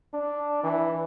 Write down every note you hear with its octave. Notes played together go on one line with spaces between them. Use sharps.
D4
E3